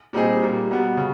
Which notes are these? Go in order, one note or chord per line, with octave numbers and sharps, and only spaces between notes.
A#2 G3 C4 D#4 G#4
A#2 G3 A#3
B2 G3 B3
C#3